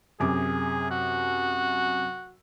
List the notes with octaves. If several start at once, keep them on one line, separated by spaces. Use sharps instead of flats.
F#2 C3 G#4 D6
F#4